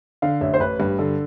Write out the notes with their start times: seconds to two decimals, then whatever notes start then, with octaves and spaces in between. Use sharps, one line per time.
0.22 D3 F5
0.41 A1 E5
0.54 C5
0.60 A1 B4
0.79 G2 B4
0.98 D3 A4